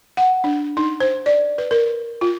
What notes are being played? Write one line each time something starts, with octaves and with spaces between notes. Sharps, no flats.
F#5
D4
D#4
C5
D5
B4
A#4
F4